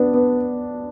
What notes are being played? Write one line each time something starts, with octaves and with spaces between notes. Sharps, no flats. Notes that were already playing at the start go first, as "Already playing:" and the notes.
Already playing: B3 D4
B3